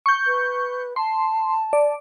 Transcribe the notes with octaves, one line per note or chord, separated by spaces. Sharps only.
C#6 G6
B4
A5 C6
D5